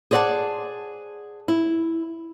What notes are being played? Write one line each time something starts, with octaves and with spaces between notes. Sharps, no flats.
G#4 C5 D5 D#5 F#5 A5
E4